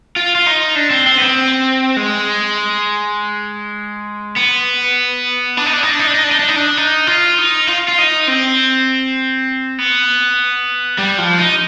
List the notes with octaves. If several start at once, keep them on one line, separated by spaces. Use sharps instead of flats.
F4
F4
D#4
D4
C4
C4
B3
C4
G#3
B3
D4
D#4
D4
D#4
D4
D#4
D4
D#4
D4
D#4
D4
D#4
D4
D#4
F4
D#4
F4
F4
D#4
C4
B3
G3
F3
D#4